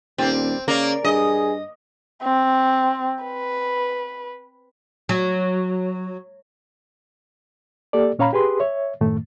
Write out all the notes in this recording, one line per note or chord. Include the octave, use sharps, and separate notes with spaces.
D#1 G3 A#3 C4
C#3 A#3 A#4 D5
G2 G#4 D#5
C4
B4
F#3
A#3 G4 A4 D5
A#2 C#4 C#5 F5 A#5 B5
G4 G#4 B4 C6
C#5 E5
F#2 A2 D#3 A3